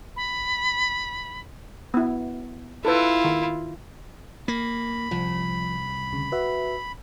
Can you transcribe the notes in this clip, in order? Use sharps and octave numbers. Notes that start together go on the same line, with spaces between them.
B5
B3 E4
E4 F4 A4 B4
D#3
A#3 B5
C2 F3
D2 C#3
F#4 B4 E5